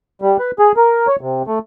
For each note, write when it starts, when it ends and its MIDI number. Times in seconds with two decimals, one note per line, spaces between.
0.22 0.37 55
0.39 0.51 71
0.59 0.72 68
0.77 1.07 70
1.07 1.16 73
1.21 1.43 48
1.47 1.59 57